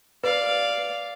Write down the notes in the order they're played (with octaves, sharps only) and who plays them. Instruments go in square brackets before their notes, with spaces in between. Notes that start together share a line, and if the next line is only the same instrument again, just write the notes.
[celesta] B4 [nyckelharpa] D5 F5